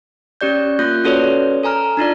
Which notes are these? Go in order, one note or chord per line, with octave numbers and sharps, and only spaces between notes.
C#4 G4 D5 G6
A#3 F4 F#6 G6 A#6
C#4 F#4 A4 B4 C#5 D5
A4 G#5 A#5 F6
D4 D#4 F4 D5